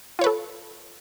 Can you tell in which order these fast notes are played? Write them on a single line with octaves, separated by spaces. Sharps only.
F4 C#5 B4 A4